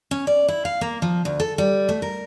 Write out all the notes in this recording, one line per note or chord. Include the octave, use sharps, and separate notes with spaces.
C#4
D5
E4
F5
A#3
F3
D2
A4
G3
A3
A#4